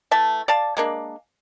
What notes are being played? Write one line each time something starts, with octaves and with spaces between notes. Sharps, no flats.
E3 A3 E5 A5
D5 F5 A5
G#3 A#3 D4